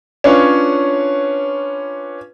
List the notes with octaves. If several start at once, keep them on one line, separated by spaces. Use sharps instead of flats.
C#4 D4 F4 B4 C#5